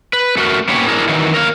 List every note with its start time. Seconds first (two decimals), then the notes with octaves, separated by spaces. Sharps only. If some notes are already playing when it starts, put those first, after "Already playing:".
0.13 B4
0.37 A3 F#4 A#4
0.69 A#3 B3 C#4 G4 C#5
0.87 D4 E4 G#4 A#4
1.09 D#3 E3 F#3
1.34 A#4 C#5 F5